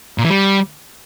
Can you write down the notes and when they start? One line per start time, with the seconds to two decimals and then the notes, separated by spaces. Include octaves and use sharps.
0.18 A#2
0.24 E3
0.30 G3